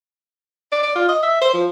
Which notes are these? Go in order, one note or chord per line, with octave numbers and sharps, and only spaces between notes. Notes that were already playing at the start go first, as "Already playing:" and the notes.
D5
D5
F4
D#5
E5
C5
F3